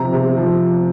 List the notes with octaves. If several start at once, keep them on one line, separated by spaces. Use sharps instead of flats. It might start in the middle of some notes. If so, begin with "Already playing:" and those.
Already playing: C3 F3 C4 A#5
C3
F3